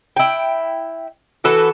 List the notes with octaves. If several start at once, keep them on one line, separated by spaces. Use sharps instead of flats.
E4 G5
E3 F#4 A4 B4